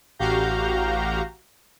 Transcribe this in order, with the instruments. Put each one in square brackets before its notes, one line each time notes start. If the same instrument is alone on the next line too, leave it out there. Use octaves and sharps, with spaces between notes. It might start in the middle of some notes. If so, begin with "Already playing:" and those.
[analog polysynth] A1 F#4 G4 F5 A#5 G6